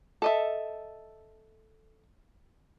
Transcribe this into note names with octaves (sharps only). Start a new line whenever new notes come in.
A4 D#5 E5